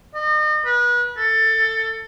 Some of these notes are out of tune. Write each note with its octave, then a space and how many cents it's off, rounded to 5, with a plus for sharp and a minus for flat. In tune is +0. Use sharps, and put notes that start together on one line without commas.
D#5 -40
B4 -30
A4 +20